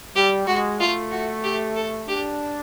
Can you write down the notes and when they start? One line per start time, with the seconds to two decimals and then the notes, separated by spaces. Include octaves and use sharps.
0.16 G3 G4
0.47 G#3 F#4
0.80 A3 F4
1.11 F#4
1.43 G4
1.76 A4
2.07 D4 G4